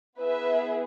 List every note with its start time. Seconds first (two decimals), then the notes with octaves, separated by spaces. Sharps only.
0.19 B3 E4 G#4 B4 E5